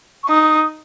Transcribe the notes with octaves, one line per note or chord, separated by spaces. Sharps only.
C#6
D#4 D#6